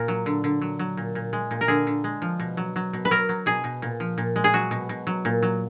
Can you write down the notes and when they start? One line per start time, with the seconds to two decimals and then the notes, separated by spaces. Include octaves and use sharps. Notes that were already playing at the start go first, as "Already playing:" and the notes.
Already playing: A#2 A#4
0.08 F#3
0.26 D3
0.44 D3
0.61 F#3
0.79 F#3
0.97 A#2
1.15 A#2
1.33 G#3
1.51 A#2
1.61 A#4
1.68 D3 G#4
1.87 D3
2.04 G#3
2.22 F3
2.40 B2
2.57 F#3
2.76 F#3
2.93 B2
3.05 B4
3.11 F#3 A#4
3.29 F#3
3.46 B2 G#4
3.64 B2
3.82 A#2
4.00 F3
4.18 A#2
4.36 G#3
4.44 G#4
4.53 F#3 F#4
4.71 B2
4.89 B2
5.07 F#3
5.25 A#2
5.42 F#3